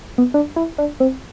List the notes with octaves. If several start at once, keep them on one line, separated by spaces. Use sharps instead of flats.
B3
D4
E4
D4
C4